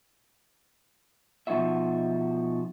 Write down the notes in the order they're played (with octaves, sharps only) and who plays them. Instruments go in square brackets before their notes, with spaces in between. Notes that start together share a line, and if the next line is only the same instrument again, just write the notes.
[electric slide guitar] B2 F3 C#4 D#4 F#4 E5